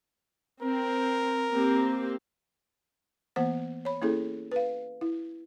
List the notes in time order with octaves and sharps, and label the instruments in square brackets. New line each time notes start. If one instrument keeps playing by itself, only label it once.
[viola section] C4 [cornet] A#4
[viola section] A#3 C4 G4
[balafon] E3 A#3 B3 C5 F#5
C#5 B5
A#3 C#4 E4 G#4 A4
B4 F5
E4